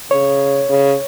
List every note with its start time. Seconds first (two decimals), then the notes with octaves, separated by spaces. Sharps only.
0.11 C#3 C#5
0.69 C#3